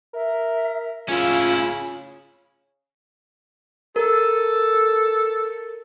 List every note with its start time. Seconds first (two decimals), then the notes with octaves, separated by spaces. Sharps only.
0.14 A#4 E5
1.09 C#3 C#4 E4 F4
3.96 A4 A#4